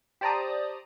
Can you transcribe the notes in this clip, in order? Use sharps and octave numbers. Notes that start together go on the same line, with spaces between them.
G4 C5 D5 A5 A#5 D#6